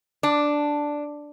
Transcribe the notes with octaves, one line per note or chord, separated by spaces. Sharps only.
D4